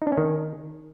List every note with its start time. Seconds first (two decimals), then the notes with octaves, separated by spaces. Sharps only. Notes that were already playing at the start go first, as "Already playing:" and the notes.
0.02 D#4
0.07 D4
0.12 C#4
0.18 D#3